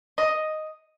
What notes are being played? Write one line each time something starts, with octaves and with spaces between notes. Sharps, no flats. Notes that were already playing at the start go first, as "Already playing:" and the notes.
D#5